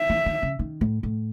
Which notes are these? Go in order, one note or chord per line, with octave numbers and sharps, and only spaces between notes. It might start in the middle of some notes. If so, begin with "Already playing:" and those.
Already playing: E5
E3
D#3
C#3
D#3
A2
A2